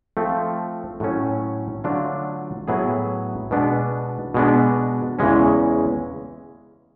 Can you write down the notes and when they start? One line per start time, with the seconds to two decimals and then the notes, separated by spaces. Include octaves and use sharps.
0.17 F3 A3 C4
1.00 A2 F#3 A3 C#4
1.84 D3 F#3 A3 D4 F4
2.68 A2 F#3 B3 E4 G#4
3.51 B2 G#3 B3 D4
4.34 B2 G#3 B3 D4
5.19 E2 C#3 E3 G#3 C#4